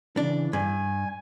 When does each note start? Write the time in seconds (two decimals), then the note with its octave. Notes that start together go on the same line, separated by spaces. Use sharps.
0.17 C#3 E3 D4
0.53 G2 G#5